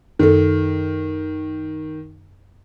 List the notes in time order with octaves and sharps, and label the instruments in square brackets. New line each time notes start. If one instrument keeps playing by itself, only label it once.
[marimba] F#2 A4 [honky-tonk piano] D#3